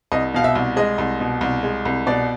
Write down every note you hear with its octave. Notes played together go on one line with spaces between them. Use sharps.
C2 D#5
B2 F5
E5
C2
G#3 D#5
C2
B2
C2
G#3
C2
B2 D5